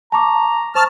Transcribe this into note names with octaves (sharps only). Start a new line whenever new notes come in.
A5 A#5 C#6 D6
C5 A5 C#6 D#6 F6